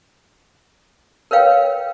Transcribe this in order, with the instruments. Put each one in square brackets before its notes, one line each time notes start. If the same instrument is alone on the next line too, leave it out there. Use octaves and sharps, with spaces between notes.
[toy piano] A#4 B4 C#5 F5 G5